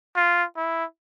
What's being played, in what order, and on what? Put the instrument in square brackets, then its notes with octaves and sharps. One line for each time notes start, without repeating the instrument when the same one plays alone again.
[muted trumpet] F4
E4